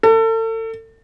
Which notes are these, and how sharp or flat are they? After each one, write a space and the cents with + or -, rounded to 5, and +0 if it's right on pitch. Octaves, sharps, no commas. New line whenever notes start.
A4 +35